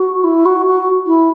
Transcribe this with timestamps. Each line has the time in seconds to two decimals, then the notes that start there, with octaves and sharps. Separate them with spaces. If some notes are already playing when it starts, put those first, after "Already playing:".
Already playing: F#4
0.23 E4
0.45 F#4
0.66 F#4
1.07 E4